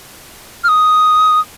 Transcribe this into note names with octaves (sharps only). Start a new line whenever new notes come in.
F6
D#6